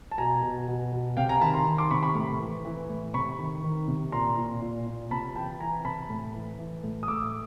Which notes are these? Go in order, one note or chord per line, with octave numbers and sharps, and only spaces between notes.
A5
B2 G#5 A#5
B2
B2
B2
C3 F5 G5
G#5 A#5
D#3 A5 B5
A#5 C6
D#3
C6 D6
C3 B5 C#6
B5 C#6
A2
E3
E3
A2
C3 B5 C#6
D#3
D#3
C3
A#2 A#5 C6
A#2
A#2
A#2
C3 A5 B5
E3 G5 A5
E3 G#5 A#5
C3 A5 B5
A2
E3
E3
A2
D#6
A2 D6 E6